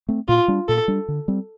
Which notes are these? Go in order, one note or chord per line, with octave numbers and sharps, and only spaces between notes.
A3 C4
A#2 F4
G3 D4
A#2 A4
G3 D4
D3
G3 C4